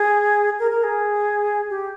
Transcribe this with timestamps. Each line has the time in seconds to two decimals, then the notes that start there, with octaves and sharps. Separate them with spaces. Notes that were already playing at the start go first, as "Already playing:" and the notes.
Already playing: G#4
0.59 A#4
0.71 A#4
0.84 G#4
1.70 G4